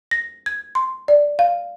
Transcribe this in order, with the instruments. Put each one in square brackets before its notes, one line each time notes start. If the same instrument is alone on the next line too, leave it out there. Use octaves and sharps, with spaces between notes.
[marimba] A#6
G#6
C6
D5
F5